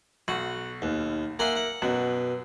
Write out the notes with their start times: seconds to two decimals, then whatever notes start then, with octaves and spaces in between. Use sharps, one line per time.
0.28 B1 F#4
0.82 D#2
1.39 A#3 E5 F#5 G#5 C6
1.55 F#5
1.82 F#2 B2